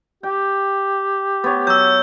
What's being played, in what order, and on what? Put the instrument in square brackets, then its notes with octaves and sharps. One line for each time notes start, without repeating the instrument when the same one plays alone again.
[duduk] G4 [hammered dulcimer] G5
[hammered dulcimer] B3 C#5
[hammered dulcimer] F#3 [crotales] E6 G6